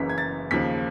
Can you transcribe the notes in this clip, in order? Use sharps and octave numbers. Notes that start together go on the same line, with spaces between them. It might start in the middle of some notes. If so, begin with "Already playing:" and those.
Already playing: F#1 F#2 C#3 E3 B6
G#6
A6
D#2 C#3 F3 B6